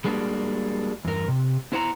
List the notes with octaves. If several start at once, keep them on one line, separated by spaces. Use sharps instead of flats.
G3 G#3 A#3 D4 F#4
E2 G2 A#4
C3
B3 E4 C5 F5 F#5 A#5